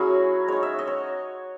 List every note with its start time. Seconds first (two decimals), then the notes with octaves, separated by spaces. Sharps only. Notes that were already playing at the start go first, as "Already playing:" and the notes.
Already playing: F#3 C#4 E4 F#4 G#4
0.48 G#3 D#4 C#5
0.63 E5
0.79 D#5
0.87 C#5